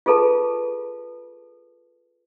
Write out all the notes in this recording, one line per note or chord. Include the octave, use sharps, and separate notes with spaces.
F4 G#4 A4 B4 A5